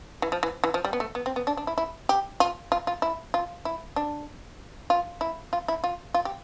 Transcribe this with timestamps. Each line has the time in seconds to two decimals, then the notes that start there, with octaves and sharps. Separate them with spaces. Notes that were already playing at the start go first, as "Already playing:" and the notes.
0.22 E3
0.32 F3
0.43 E3
0.64 E3
0.74 F3
0.85 G3
0.93 B3
1.00 A3
1.15 B3
1.26 C4
1.36 B3
1.47 D4
1.57 D4
1.67 E4
1.78 E4
2.09 G4
2.40 F4
2.72 F4
2.87 F4
3.02 E4
3.34 F4
3.65 E4
3.96 D4
4.90 F4
5.21 E4
5.53 F4
5.68 E4
5.84 F4
6.14 F4
6.25 G4